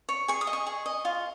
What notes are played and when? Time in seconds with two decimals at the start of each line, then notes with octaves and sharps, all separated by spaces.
0.09 C#5
0.28 G#4 C#6
0.41 D#6
0.47 D#5
0.53 C#6
0.67 G#4
0.86 D#5
1.05 F4